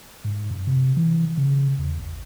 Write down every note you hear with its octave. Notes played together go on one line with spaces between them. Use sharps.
G#2
F#2
C3
E3
C#3
E2
A1